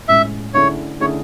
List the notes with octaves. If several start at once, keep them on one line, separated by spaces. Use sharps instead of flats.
A2 G#3 C#4 E5
D3 A3 C#4 E4 G#4 C#5
D3 A3 C#4 E4 G#4 C#5